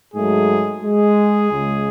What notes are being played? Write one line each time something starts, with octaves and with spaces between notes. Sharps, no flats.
G#2 F#3 G#3 A3 G#4
G#3 G#4
C#2 C#3 G#3